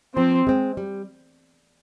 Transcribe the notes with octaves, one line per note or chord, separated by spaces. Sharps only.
F3 C4
G#3 C4
G3